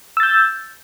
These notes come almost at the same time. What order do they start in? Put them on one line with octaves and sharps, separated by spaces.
E6 A6 G6